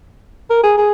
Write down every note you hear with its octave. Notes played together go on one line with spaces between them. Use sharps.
A#4
G#4
G#4